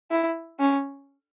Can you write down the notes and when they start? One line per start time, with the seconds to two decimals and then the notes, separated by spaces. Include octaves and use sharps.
0.11 E4
0.60 C#4